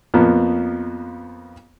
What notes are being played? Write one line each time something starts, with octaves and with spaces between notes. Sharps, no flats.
F2 F3 A#3 B3